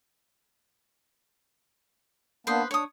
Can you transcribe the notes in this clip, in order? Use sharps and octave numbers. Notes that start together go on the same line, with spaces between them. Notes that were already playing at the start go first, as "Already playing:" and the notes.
A#3 B3 D4 B4 C5 D#6
D4 C#5 D#6